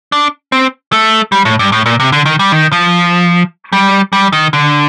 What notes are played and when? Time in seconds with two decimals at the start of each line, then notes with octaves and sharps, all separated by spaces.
0.12 D4
0.52 C4
0.92 A3
1.32 G3
1.45 A2
1.59 G2
1.72 A2
1.86 A#2
2.00 C3
2.12 D3
2.26 D#3
2.39 G3
2.52 D#3
2.72 F3
3.73 G3
4.13 G3
4.33 D#3
4.53 D3